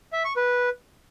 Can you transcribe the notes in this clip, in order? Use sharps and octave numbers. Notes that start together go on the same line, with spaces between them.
E5
C#6
B4